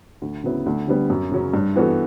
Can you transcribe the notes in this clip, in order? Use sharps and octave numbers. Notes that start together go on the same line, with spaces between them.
D2
C#3 F#3 B3 E4
D2
D3 G3 B3
F#2
C#3 F#3 C#4
G2
E3 B3 F#4 A4